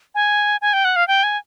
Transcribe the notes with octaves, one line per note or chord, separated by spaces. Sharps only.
G#5
G#5
G5
F#5
F5
G5
G#5